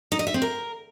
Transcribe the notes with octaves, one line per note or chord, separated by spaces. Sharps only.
D#4
D#5
E5
C4
A#4